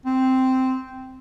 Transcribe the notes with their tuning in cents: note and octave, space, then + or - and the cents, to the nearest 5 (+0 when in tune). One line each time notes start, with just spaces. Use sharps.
C4 -5